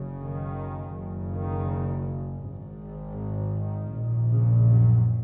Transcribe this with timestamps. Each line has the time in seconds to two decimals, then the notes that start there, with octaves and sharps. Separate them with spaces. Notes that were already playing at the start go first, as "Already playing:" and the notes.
Already playing: F#1 F#2 C#3
0.21 D#3
0.95 F#1 F#2 C#3
1.34 D#3
2.45 G#1 G#2
3.57 D#3
3.94 A#1 A#2
4.31 C#3
4.68 F#2 F#3